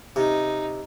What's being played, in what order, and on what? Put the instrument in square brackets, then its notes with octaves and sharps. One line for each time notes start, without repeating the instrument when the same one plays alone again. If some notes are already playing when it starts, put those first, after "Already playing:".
[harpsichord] C3 [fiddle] D#4